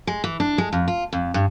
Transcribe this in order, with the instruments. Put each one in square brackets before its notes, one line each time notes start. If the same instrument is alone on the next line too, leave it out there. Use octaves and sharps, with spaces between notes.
[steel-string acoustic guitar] G#3
E3
D4
G#3
F2
F4
F2
G2